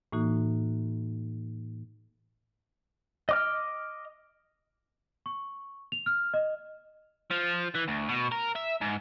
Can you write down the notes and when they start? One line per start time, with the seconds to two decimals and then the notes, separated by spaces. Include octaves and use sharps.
0.12 A2 E3 A#3 D#4 F#4
3.29 D#5 D6 F6
5.26 C#6
5.92 F7
6.06 F6
6.34 D#5
7.31 F3
7.75 E3
7.88 D2
8.09 B2
8.32 A#4
8.56 E5
8.82 G#2